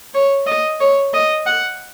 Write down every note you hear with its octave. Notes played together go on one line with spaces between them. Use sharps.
C#5
D#5
C#5
D#5
F#5